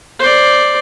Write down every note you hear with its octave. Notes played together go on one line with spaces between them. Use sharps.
C5 D5